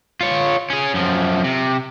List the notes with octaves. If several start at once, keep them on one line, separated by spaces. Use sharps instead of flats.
F4 C#5
C#4 G#4
F#2 F3
C3